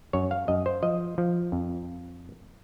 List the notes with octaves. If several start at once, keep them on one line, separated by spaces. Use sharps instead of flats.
F#2 C#5
F5
F#2 D#5
C5
F3 D#5
F3
F2